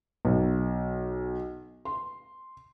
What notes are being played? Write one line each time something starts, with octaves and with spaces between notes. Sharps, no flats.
B1
C6